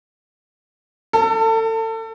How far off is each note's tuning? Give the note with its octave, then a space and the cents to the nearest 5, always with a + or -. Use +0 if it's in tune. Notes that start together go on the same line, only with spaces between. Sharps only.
A4 +30